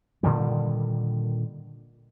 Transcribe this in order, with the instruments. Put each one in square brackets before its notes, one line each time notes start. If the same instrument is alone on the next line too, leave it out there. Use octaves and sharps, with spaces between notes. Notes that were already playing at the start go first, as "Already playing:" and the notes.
[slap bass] A#2 D3 D#3 G3